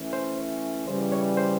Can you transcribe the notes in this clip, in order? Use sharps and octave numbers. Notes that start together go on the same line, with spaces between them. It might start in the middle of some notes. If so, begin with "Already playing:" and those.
Already playing: E3 A3 C#4
C5
C#3 E3 G3 C5
C#5
C5